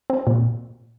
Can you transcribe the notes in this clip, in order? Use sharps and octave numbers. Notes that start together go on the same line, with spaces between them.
C4
A#2